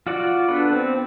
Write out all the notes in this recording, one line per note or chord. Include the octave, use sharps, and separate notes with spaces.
F4 F#4 D5
B3 D4 A4 B4
C4